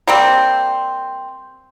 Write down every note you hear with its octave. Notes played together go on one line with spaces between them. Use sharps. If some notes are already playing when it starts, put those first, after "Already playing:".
G3 A#3 C4